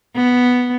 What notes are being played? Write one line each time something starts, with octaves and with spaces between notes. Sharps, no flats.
B3